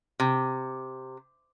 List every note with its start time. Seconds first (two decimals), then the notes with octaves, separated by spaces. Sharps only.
0.20 C3